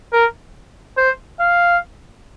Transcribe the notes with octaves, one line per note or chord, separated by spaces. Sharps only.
A#4
C5
F5